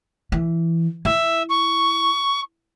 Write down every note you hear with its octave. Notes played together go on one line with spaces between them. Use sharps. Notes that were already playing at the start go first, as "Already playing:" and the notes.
E3
E4 E5
C#6